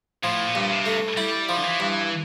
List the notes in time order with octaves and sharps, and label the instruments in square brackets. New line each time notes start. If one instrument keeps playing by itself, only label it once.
[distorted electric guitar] A2 [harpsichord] F3
[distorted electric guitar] A#2
[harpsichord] G2
[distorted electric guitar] C3
[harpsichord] A3
[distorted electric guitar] G3 [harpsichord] E4
[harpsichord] F3
[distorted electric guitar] D3
E3
[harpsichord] G2